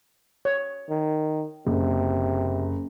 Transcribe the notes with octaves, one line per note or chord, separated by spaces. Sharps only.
C#5
D#3
F#1 C3